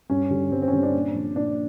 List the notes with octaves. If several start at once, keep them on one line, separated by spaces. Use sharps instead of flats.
G2 C#4
D3 G3
G2 C4
C4
C#4
D3 G3 C4
D4
A#2
F3
A#2 D4